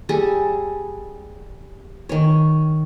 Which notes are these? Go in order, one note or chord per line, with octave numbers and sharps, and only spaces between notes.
G3 G#4 A4
D#3 C#5